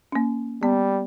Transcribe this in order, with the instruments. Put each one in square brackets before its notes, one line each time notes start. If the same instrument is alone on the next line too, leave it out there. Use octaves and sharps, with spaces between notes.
[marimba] A#3 C#4
[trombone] G3 [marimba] B3